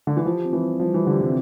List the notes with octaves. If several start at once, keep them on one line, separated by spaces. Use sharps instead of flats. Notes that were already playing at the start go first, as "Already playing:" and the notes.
D3
E3
F3 G4
C4
E3
G3
F3 G3
E3 G4
D3
C3 C4